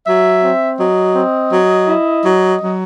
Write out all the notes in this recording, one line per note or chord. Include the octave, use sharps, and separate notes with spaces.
F#3 E5
C4
F#3 D#5
C4
F#3
E4
F#3
F#3